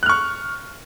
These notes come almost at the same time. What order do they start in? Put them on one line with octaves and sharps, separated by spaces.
F#6 F6 C#6